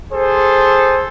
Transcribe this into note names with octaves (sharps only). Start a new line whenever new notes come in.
G#4 A4 C5